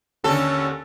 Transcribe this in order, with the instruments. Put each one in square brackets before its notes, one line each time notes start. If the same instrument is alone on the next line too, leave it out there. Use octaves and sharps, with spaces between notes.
[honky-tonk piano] D#2 D3 [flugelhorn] C#4 [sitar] A4